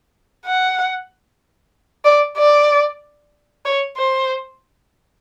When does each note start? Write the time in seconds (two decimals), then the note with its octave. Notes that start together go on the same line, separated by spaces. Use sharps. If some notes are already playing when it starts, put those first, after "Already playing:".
0.45 F#5
2.05 D5
2.38 D5
3.65 C#5
3.97 C5